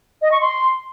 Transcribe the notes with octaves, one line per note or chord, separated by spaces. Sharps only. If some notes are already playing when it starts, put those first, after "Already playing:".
D#5
C#6
C6